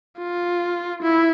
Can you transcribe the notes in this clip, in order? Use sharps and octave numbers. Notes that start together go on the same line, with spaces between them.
F4
E4